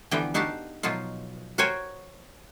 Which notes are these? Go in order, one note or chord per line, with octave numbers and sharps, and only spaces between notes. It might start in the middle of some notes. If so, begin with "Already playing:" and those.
D3 E3 F3 G3 B3 G5
D4 D#4 F#4 G4 F5 A5
B2 F3 F#3 D#4 F4
F#4 A#4 C5 C#5 G5 G#5